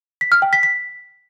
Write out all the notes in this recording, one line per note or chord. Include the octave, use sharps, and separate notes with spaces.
B6
F6
G5
B6
B6